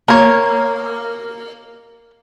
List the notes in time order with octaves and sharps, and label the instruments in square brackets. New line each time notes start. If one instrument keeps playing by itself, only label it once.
[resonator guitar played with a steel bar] A#3 [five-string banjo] A#4 C#5